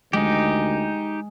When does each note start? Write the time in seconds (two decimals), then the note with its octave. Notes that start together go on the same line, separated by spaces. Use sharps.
0.13 D2 G#3 D#4 G4